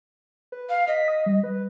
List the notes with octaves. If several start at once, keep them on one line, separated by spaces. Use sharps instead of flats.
B4
F5
D#5 B6
D#6
G3
B4